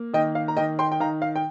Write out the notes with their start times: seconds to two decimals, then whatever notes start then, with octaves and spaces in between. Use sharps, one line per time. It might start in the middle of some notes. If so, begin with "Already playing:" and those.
Already playing: A#3
0.13 D#3 D#5 G5
0.35 F5
0.48 A#5
0.57 D#3 D#5 G5
0.79 G5 C6
0.92 G5
1.00 D#3 F5 A#5
1.22 F5
1.36 G5